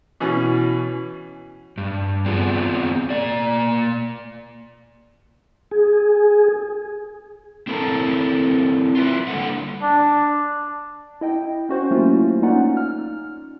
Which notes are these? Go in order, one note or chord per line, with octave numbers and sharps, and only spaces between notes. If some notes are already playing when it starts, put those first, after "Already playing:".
B2 E3 C#4
G2
B3 C4 F4 G#4 D5
A#3 D5
G#4
C4 E4 A4 A#4 A5 A#5
F4 B4 E5
D3 G3 G#3 A#3 A4 F#5
D4
E4 D#5 G5
C#4 F#4 C5
F#3 A3 A#3 C#4 E4 F4
A#3 C#4 D#4 F4 D5 F#5
F6